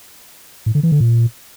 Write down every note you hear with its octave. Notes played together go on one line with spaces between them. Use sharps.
A2
D3
E3
D3
A#2